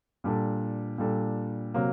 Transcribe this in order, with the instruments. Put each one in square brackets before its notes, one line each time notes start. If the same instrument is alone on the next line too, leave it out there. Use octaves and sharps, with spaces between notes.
[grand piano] A#2 G3 D4 A4
A#2 G3 D4 A4
C3 F#3 A#3